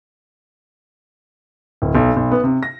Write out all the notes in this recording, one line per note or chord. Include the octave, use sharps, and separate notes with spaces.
D1
B1
B1
B3
C3
A#6